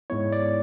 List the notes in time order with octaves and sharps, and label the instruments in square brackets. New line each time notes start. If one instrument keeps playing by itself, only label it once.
[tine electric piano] G#2 G#3 B3 E4 C#5
D5